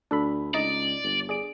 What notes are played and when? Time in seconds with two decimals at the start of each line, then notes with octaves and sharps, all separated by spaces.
0.11 D2 D4 A4 B5
0.54 C#2 D#4 D5 D#5
1.03 G1
1.29 G#4 D5 D7